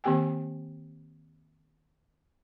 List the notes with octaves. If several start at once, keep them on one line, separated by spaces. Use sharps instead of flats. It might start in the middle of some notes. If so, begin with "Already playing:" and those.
D#3 A#3 C4 G4 G5 G#5